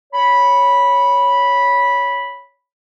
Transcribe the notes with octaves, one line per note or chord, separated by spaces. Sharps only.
C#5 B5